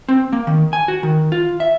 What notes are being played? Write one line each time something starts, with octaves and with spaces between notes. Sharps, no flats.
C4
A#3
D#3
G#5
F#4
D#3
F4
E5